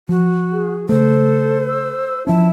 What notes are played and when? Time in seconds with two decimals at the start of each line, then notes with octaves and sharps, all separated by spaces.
0.09 F3 F#4
0.53 G#4
0.89 C#3 A3 A4 C5
1.68 E6
2.27 F3 C#4 E4 A5